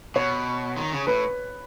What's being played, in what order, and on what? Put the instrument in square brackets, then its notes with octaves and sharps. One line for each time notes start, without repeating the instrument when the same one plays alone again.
[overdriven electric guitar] B2 [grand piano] C#5
[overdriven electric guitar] D#3
C#3
[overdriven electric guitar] A2 [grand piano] B4